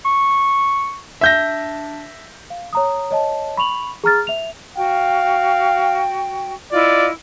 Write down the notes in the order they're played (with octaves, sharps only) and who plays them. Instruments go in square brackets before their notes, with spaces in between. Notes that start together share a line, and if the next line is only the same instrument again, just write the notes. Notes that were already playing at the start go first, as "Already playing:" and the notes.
[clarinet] C#6
[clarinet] D4 [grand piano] E5 G6 A#6
[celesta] F5
C#5 A#5 D#6
C#5 D#5 A5
B5 C#6 F7 F#7
G#4 A#5 F6 A6
E5 F7
[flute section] F#4 G5 [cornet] F5
[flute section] E4 F4 D#5 [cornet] D5